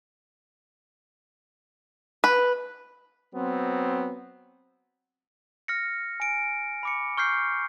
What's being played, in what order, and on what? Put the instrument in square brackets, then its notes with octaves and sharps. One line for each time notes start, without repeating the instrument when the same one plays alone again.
[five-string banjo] B4
[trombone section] F#3 B3 C4
[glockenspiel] F6 A#6 C#7
G#5 D7
B5 D6 C#7
C#6 F6 G6 C7